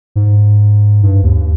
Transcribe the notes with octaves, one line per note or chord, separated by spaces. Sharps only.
G#2
G2
D#2